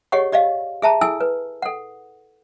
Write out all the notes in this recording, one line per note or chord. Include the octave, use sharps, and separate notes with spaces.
G4 G#4 C#5 D#5 F#5 C#6
G4 D5 D#5 F5
G#4 E5 A5 A#5
E4 G#4 A4 G#5 E6
B4
A4 F#5